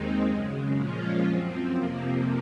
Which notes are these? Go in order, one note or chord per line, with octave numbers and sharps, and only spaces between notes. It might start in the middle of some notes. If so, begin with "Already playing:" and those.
Already playing: D#2 D#3 G#3 C4 D#4
F#2 C#3 G#3
A#2 F3 G#3 C#4 F4
F#2 F3 C4
F2 C3 F3 A#3